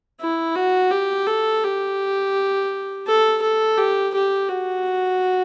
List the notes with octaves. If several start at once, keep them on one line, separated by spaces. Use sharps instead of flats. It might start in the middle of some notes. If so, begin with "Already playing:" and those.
E4
F#4
G4
A4
G4
A4
A4
G4
G4
F#4